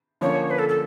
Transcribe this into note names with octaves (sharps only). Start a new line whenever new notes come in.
D3 F3 A#3 C#4 C#5
B4
A4
A4